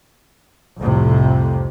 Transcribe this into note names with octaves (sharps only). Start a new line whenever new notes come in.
C2 F2 A2 C3